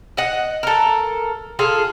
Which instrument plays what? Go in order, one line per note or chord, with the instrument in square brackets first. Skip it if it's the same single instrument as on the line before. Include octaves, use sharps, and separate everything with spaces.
[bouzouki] D#5 F#5
A4 A#4
F4 G#4 A4 F5